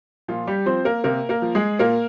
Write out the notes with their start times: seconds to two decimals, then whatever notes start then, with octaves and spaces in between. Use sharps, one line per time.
0.28 A#2 F3 F4
0.47 G3 G4
0.66 F3 C4 C5
0.85 A#3 A#4
1.04 C3 A#3 A#4
1.29 A#3 A#4
1.42 F3
1.55 G#3 G#4
1.79 A#2 A#3 A#4